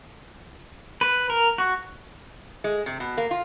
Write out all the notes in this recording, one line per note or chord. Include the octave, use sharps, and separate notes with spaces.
B4
A#4
F#4
G#3
C3
B2
A#3
F4